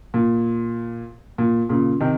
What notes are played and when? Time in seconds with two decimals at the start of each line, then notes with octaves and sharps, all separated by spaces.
0.14 A#2
1.38 A#2
1.69 A#2 C#3
2.00 C3 D#3